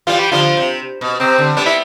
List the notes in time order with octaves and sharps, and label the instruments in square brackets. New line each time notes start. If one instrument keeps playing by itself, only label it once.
[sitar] E3 G3 [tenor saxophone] F4
[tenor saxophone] G4
[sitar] D3 F3 [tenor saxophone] F4
[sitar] C3
B2
[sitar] C3 [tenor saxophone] C4
[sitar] D3
[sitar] G3 B3 [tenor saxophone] D4
[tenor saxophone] E4